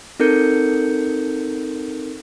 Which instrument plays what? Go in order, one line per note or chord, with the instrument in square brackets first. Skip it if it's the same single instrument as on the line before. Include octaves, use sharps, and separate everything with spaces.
[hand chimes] C4 D#4 A4 A#4 G6 C#7